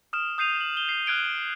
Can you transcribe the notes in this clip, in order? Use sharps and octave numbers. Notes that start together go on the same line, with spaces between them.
D#6 F6 E7
D#6 G6 C7 D#7 F7
F#7
D#6 G7
C7
F6 F#6 G#6 D7 G7